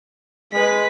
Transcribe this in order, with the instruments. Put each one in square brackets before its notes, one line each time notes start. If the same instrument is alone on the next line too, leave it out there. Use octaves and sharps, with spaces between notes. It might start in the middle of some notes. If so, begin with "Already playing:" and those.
[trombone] G#3 [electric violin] B4 B6